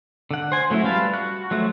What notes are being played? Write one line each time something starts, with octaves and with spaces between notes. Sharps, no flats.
D3 F#5
C5 G#5
F#3 A3 C#4 E4
G3 F4 B4 F5 A5
F#4 F#6
F3 F#3 A3 F#4